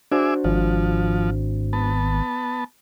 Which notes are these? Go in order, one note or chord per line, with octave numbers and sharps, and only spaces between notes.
D4 F#4 G#4 C5 E5 D6
G#1 F3
B3 A5